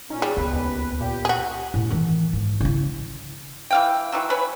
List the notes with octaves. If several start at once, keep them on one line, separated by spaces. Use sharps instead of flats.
A#2 C#4 D#4
G3 G#4
C#2 B3 B4
D#2
A#2 G4
F#4 G#4
A2
D#3 E3
G#2
C#3 E4
E3 F5 G5
D#3 E3 F#3
B4 C#5 G#5 B5